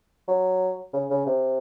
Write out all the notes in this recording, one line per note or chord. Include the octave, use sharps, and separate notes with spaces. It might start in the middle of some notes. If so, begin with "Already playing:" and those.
F#3
C#3
C#3
C3